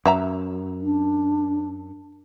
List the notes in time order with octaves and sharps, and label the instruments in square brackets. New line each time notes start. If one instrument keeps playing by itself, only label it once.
[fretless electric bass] F#2 [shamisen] F#3 E5 A#5
[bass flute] D4